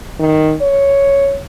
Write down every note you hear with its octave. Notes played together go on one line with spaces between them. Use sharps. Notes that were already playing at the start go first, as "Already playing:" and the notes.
D#3
C#5